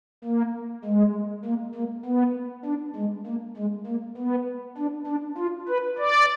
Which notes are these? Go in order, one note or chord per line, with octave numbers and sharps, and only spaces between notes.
A#3
G#3
A#3
A#3
B3
D4
G#3
A#3
G#3
A#3
B3
D4
D4
F4
B4
D5